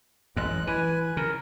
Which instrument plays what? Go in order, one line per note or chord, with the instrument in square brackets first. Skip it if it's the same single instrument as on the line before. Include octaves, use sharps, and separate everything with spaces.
[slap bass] A1 F#2 [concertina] G#3 F#6
[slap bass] E3 [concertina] B4 G#5
[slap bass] C#3 [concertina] A#4